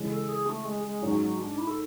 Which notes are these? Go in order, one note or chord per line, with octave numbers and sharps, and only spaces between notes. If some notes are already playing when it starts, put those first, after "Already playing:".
Already playing: C#3 E3 G#3 C#4
A4
G#4
A3
G#3
G#3
G#2 F#3 G#3 C#4 G#4 C#5
F#3
D4
E4
A4